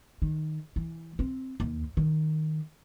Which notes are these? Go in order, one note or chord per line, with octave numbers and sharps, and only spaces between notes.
D#3
E3
C4
D#2
D#3